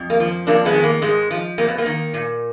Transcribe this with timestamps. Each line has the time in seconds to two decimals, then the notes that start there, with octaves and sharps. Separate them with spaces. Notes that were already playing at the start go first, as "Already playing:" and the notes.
Already playing: F2
0.10 A#3
0.20 F3
0.47 F2 A#3 D4
0.65 G#3 B3
0.74 D#3
0.83 A#3
1.02 G#2 G#3
1.31 F3
1.58 F2 A#3
1.69 B3
1.78 A#3
1.86 D#3
2.14 A#2